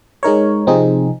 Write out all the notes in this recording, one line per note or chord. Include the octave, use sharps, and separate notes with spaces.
G#3 D#4 A#4 C#5
C3 F3 C4 D#4 G#4